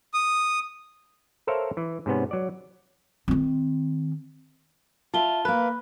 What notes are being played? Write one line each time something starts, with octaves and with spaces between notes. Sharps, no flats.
D#6
A4 A#4 C5 C#5 E5 F5
E3
G#2 C3 B3 C#4
F#3 D5
D#3 C4
F4 E5 A5 G7
A#3 B4 B5 F#6